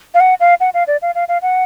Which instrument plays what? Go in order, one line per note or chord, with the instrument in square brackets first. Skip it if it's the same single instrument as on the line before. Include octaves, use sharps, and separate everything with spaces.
[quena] F5
F#5
F5
F#5
F5
D5
F5
F5
F5
F#5